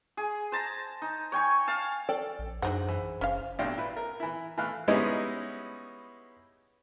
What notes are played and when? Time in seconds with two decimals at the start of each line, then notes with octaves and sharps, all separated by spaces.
0.17 G#4
0.52 C5 A5 A#5
1.02 D#4
1.32 C#5 G5 G#5 C#6
1.68 F5 A5
2.09 A4 D5 G5
2.39 A#1
2.62 F#2 D3 F#3 D#4 G#4 C5 F#5
2.89 E3
3.21 F#1 C#4 F5
3.59 B1 A2 C3 D4 F5 G5
3.78 E4 B4
3.96 A#4
4.20 E3 E4
4.58 E3 A3 F5 F6 F#6
4.88 G3 G#3 B3 C#4 D#4 E4